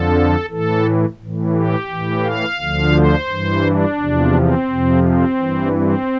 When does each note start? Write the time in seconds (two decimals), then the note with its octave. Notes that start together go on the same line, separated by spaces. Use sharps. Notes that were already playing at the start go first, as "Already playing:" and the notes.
Already playing: F2 D3 F3 A4
0.50 A2 E3 A4
1.20 A2 E3
1.55 G4
1.89 A2 E3
2.24 F5
2.59 D2 D3 F3
2.94 C5
3.29 G2 E3
3.64 D4
3.98 E2 C3 F3
4.34 C4
4.69 F2 C3 F3
5.03 C4
5.39 G2 E3
5.73 C4